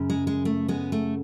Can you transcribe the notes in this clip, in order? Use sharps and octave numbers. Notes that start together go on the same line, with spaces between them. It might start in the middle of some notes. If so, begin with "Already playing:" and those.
Already playing: F#2 C#3
G#3
G#3
A3
G#3 B3
A3